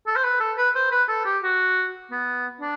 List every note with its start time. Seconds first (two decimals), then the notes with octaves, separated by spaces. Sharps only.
0.07 A4
0.16 C5
0.24 B4
0.40 A4
0.57 B4
0.75 C5
0.91 B4
1.08 A4
1.25 G4
1.43 F#4
2.11 B3
2.61 D4